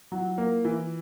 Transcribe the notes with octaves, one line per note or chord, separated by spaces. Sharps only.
F#3 E4
F4
E4
A#3 E4
E3 E4